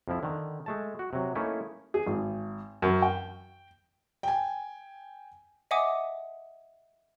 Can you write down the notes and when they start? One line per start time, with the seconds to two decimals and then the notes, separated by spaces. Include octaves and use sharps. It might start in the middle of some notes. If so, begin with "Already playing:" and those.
0.08 F2 F3 E4
0.23 D3 D#3
0.66 G#3 A3 A5
0.99 F#4
1.13 C3 F#3
1.35 A3 A#3 C#4 D#4 E4
1.94 G#4
2.07 G#1
2.82 F#2
3.02 G5
4.23 G5 G#5
5.71 D#5 E5 F#5 G#5 D6 D#6